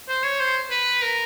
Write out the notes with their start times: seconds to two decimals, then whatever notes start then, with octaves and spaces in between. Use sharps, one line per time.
0.09 C5
0.24 C#5
0.40 C5
0.71 B4
1.02 A#4